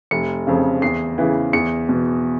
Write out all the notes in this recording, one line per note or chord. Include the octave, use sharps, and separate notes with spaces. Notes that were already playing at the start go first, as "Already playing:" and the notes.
F1 C#7
F2 C#3
E2 C7
C#3 E3
E2 C#7
B2